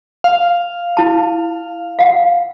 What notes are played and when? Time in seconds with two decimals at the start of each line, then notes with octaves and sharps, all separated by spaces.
0.24 F5
0.97 E4 A5
1.99 F5 F#5